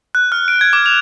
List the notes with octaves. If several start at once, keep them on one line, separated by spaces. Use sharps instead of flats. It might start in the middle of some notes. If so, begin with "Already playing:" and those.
F#6
F6
D7
G#6
D6
F7